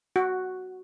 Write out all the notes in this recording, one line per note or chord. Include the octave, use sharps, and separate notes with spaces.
F#4